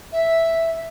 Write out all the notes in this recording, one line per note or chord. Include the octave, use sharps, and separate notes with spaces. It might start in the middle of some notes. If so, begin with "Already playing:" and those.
E5